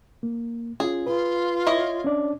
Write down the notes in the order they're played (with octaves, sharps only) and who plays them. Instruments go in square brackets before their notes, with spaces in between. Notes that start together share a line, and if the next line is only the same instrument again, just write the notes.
[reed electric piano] A#3
[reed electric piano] C#4 F4 [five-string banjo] G#4
[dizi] F4 [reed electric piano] B4
[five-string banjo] E4 C#5 D#5
[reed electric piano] C#4 D4 D5